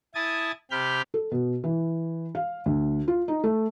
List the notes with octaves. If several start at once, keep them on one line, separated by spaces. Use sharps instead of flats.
E4 G#5 A5 D#6 A6
C3 G4 B5 F6 G6
A4
B2
E3
F5
D2
F4
D#4
A3